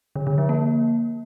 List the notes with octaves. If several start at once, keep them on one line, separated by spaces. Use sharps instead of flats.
D3
D3
F3
A#3